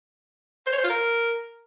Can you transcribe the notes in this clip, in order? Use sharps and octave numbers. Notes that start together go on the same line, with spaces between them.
C5
C#5
C5
F4
A#4